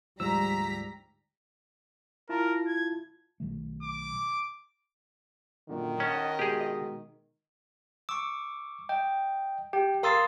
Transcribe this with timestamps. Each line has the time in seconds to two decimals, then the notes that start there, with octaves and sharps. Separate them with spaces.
0.20 D2 G#2 F3 G3 A#5 E6 B6
2.29 E4 F4 A#4 A5
2.67 G#6
3.40 B1 D#3 A3
3.83 D6
5.69 F#2 A#2 D3 D#3
6.00 C#4 D#5 F#5 A5 F#6
6.39 B2 G#3 G4 G#4
8.09 C#6 D6 E6
8.89 D#5 G5
9.73 G4 G5
10.03 A#4 F5 C6 D#6 E6 A6